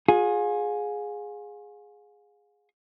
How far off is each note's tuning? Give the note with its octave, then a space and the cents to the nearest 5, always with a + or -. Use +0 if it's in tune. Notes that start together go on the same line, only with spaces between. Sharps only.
F4 +40 G#4 +0